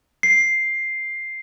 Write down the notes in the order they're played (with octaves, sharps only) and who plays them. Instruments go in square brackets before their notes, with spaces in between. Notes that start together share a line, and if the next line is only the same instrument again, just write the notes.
[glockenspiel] C7